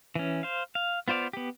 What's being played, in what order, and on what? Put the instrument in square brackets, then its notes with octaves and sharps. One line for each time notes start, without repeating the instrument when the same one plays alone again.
[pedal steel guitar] E3 C#4
C5 F5
F5
B3 F4 C5 D5 F5
B3 G4